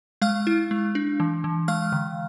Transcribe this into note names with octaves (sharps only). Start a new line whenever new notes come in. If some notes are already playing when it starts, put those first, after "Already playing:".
G#3 F5 F6
E4
G#3
D4
E3
E3
G#3 F5 F6
D3